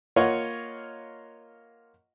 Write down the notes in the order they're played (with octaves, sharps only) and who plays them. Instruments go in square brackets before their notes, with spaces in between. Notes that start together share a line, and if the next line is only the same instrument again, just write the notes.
[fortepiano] A#3 F4 C#5 D#5 F#5